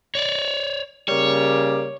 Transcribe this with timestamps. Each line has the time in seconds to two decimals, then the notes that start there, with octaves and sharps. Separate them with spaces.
0.15 C#5 D5
1.08 C#3 G3 A#3 C#5